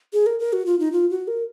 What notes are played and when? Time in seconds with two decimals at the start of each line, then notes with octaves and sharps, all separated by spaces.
0.13 G#4
0.26 A#4
0.39 A#4
0.53 F#4
0.66 F4
0.79 D#4
0.92 F4
1.10 F#4
1.28 A#4